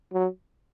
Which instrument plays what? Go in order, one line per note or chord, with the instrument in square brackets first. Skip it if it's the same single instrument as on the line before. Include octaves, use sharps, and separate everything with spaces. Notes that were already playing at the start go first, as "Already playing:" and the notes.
[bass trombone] F#3